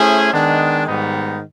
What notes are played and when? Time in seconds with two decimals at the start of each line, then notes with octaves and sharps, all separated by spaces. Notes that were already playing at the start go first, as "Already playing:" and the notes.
Already playing: A3 C#4 E4 G#4 C5
0.32 D#3 G#3 B3 D4
0.87 G#2 D#3 G3 B3 D#4